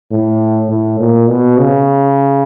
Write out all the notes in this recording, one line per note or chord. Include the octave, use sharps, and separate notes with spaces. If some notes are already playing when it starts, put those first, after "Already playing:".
A2
A2
A#2
B2
C#3